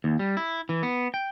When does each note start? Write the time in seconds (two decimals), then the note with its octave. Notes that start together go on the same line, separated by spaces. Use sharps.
0.04 D#2
0.19 G3
0.37 E4
0.69 E3
0.83 B3
1.14 G5